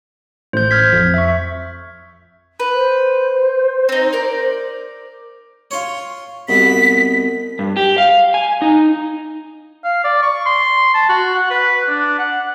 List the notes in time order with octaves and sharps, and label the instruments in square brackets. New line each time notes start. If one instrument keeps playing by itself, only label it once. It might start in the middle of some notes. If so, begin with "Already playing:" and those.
[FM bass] A1 [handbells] C5 G6
[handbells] F6 G#6 B6
[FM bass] F2
[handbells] E5 C#6
[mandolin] B4
[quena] C5
[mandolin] C4 D#4
A#4 D5
[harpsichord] F4 C#5
[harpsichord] C2 B2 [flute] B6
[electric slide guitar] G2
G4
F5
G#5
D#4
[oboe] F5
D5
C#6
C6
A5
F#4
F#5
B4
D4
F#5